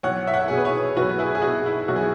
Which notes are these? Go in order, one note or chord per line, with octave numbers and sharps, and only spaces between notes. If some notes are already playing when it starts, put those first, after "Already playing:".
B1 C#5 F#5
E5
C#5 F#5
B2 G#4
B4
G#4 C#5
B1 F#4 B4
E4 G#4
G#4
B2 F#4
E4
B1 F#4
G#4